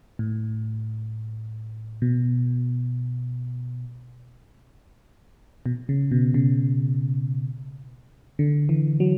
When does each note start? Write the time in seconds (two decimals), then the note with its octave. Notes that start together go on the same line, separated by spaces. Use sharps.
0.19 A2
2.02 B2
5.66 B2
5.89 C#3
6.11 B2
6.34 C#3
8.39 D3
8.69 E3
9.00 F#3